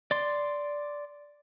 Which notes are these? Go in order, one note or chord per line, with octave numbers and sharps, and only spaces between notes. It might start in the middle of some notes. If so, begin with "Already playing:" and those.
D5 C6